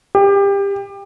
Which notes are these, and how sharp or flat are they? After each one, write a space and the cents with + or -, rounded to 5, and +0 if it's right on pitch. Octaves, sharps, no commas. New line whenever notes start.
G4 +25